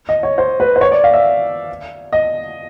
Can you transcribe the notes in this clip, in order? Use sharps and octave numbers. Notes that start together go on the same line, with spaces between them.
D#5
C#5
C5
B4
C5
C#5
D5
F5
E5
D#5